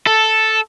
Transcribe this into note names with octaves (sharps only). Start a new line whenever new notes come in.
A4